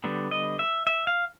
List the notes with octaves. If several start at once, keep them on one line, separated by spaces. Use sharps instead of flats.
D3 G3 B3
D#5
E5
E5
F5